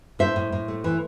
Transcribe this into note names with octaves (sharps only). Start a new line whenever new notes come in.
A2 C5 E5
A2
A2
A3
E3